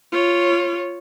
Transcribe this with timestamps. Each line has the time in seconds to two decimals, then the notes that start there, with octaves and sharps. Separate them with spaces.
0.12 F4 C#5